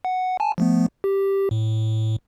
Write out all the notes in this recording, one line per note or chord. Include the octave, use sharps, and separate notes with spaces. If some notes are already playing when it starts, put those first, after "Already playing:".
F#5
G#5 A5
F3 A3 B3
G4
A2